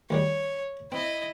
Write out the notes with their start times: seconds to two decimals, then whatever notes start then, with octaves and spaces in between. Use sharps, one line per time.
0.10 D2 D#3 G3 C#5
0.92 C4 E4 D#5